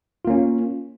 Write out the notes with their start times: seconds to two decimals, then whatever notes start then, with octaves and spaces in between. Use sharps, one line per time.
0.25 F4
0.27 A#3
0.30 C#4